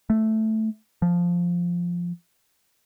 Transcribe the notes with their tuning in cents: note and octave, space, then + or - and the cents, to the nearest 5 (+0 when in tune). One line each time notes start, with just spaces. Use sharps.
A3 -5
F3 +0